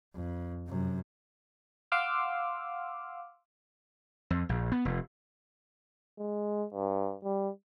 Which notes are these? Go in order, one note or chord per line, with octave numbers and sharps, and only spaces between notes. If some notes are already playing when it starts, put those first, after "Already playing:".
F2
F#2 C3
F5 F#5 C6 D6 E6 F6
F2
A#1
B3
F1
G#3
G2
G3